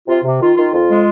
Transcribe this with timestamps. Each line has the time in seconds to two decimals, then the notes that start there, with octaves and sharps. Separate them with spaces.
0.08 C3 F4
0.23 C3
0.40 D#3 F4
0.56 D#3 F4
0.72 F2 F4
0.89 G#3